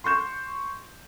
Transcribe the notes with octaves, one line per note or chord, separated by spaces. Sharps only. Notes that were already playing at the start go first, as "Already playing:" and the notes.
C6 C#6 G6 E7